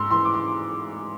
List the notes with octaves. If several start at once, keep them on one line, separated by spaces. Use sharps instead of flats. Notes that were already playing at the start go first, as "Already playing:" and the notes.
Already playing: G#2 C6 E6
E3 C6
D6
C6